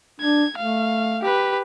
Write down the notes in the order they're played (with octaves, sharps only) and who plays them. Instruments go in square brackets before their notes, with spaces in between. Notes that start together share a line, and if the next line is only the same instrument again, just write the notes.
[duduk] D4 [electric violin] G#6
[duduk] A3 [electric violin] F5
[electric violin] G4 B4